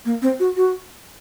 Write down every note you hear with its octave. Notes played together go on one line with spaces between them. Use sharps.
A#3
C4
F#4
F#4